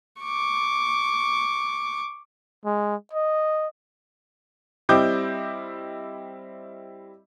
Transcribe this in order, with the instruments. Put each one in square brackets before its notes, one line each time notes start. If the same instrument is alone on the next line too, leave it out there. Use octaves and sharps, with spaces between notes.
[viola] C#6 D6
[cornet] G#3
D#5
[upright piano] G3 C4 E4 D#5 D6 G6